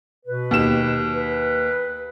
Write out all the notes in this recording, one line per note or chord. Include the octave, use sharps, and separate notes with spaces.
B2 B4
D#2 G4 E7
B4